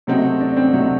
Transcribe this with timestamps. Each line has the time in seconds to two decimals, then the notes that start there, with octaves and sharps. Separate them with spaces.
0.07 C3 F#3 A3 C4 D#4 F#4
0.40 D4
0.57 C4
0.73 C3 F#3 A3 D#4 F#4